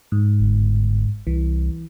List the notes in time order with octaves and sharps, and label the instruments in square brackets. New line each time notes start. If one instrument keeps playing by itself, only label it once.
[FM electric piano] G#2
[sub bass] G1
[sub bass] C2 [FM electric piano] E3